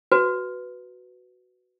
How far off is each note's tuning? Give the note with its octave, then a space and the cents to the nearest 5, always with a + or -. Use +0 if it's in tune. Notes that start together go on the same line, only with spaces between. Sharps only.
F#4 +0 B4 +0